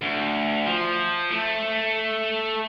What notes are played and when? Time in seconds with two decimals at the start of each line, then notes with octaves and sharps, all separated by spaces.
0.02 D2
0.66 F3
1.31 A3